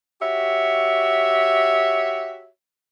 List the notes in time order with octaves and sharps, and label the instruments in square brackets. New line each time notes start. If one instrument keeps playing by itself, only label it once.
[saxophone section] F#4 G4 C#5 E5